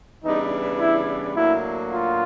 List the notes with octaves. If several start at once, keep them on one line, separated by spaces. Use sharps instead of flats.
C#3 E3 G3 B3 D4 D#4
E4
A2 F#3 A#3 D4 E4 F#4
F4